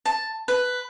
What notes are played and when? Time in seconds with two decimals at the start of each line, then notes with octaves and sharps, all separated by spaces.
0.05 A5
0.48 B4